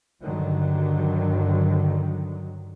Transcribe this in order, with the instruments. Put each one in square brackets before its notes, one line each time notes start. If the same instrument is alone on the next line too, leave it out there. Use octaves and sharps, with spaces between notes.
[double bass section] G2 D3 D#3 F#3